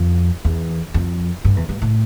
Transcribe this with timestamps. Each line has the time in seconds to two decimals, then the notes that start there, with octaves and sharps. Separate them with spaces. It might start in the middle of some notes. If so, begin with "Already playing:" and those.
Already playing: F2
0.45 E2
0.94 F2
1.44 G2
1.57 E2
1.69 G2
1.82 A2